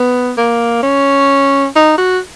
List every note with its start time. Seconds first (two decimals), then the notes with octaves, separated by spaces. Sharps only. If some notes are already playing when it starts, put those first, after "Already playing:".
Already playing: B3
0.38 A#3
0.83 C#4
1.76 D#4
1.98 F#4